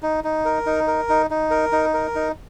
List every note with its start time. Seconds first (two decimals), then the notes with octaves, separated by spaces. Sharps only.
0.03 D#4
0.24 D#4
0.45 A#4
0.66 D#4
0.87 A#4
1.09 D#4
1.30 D#4
1.51 A#4
1.72 D#4
1.94 A#4
2.15 D#4